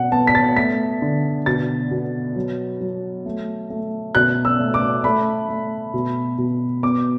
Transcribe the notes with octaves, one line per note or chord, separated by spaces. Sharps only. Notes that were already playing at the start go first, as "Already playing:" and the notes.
Already playing: B2 F#5
B3 A5
B6
A6
A3 B6
D3
B2 A6
B2
F#3
F#3
A3
A3
B2 F#6
E6
A3
D6
A3 B5
A3
B2
B2
B3 D6